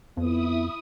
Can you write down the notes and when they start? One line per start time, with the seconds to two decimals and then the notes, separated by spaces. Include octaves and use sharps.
0.17 F2 B3 E4 D#6